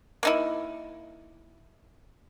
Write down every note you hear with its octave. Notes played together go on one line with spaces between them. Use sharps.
A#3 D#4 E4